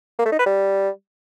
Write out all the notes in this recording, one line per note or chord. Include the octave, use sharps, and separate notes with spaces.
A#3
A3
D#4
B4
G3